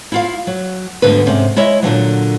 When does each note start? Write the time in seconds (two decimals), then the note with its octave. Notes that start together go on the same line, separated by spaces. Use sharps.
0.12 E4 F4 F5
0.47 F#3
1.02 D2 G#2 D3 G3 B3 B4
1.26 G#2 C3 C#4
1.56 G#3 E4 C#5 D#5 E5
1.82 A#2 D3 E3 F#3